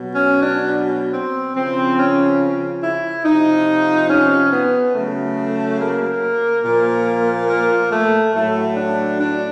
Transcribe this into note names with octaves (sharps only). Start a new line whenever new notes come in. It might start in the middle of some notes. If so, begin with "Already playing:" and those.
Already playing: B2 F#3
C#4
D4
C4
C#3 F3 C4
C#4
E4
C3 F3 D#4
C#4
B3
C#3 F#3 A3
A#3
A#2 F3
A#3
A3
A2 F#3 A3
D4
D4